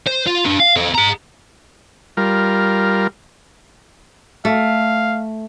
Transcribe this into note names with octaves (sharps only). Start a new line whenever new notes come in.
C5
F4
D4 B4
F5
C4 A4
G#4 A#5
G3 F4 A#4
A3 F5